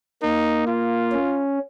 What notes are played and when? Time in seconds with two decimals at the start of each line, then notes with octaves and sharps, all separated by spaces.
0.22 A#3 D#4
0.67 F4
1.12 C#4